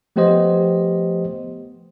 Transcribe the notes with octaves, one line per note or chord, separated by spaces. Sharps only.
F3 A3 B3 G4 C5 D#5